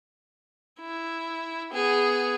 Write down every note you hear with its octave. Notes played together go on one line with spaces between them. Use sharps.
E4
B3 G#4